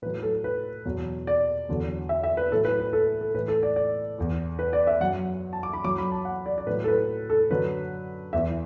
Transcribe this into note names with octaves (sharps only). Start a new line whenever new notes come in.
A2 F#3 B4
A4
B4
E2 B2 F#3
D5
E2 D3 F#3
E5
E5
B4
A2 F#3 A4
B4
B4
A4
A4
A2 E3 B4
A4
D5
D5
E2 E3
B4
D5
E5
F#2 F#3 F#5
A5
D6
B5
F#2 F#3 D6
B5
A5
F#5
D5
D5
A2 F#3 B4
A4
B4
A4
F#2 D3 F#3 B4
E2 E3 E5